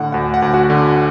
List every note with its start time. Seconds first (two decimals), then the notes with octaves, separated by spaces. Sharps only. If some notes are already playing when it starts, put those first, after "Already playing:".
Already playing: A2 D3 F#5
0.12 D2 F#5
0.34 F#5
0.42 D2
0.54 F#4 F#5
0.70 D3